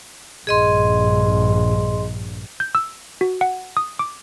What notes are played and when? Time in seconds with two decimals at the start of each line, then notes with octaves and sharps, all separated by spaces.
0.47 A#1 G2 G#4 D#5 C6
2.60 G6
2.75 E6
3.21 F#4
3.41 F#5
3.77 D#6
3.99 D6